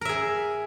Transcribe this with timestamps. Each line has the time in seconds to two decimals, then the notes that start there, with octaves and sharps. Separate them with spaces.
0.01 A#4
0.05 E5
0.09 G#4